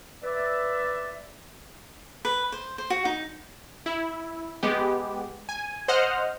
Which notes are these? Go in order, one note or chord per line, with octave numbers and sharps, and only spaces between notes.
B4 D5 E5
B4
C5
C5
F#4
D#4
E4
G#3 B3 G4
G#5
C5 D#5 F#5 F6